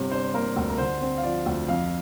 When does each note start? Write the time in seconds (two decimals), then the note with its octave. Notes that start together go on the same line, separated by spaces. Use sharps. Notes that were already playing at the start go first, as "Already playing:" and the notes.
Already playing: G1 C3
0.11 D4 C5
0.34 A#3 A#4
0.56 D2
0.70 A#4
0.78 D3 C5
1.01 C4
1.18 F5
1.23 F3 D5
1.46 D2
1.68 F2 F5